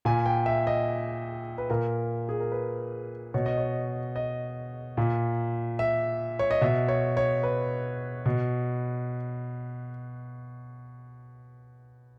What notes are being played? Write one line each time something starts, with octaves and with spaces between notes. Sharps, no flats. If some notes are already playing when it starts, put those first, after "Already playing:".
A#2 G#5
G5
E5
D#5
B4
A#2 A#4
G#4
A#4
B4
B2 C#5
D#5
C#5
D#5
A#2
E5
C#5
D#5
B2 E5
C#5
C#5
B4
B2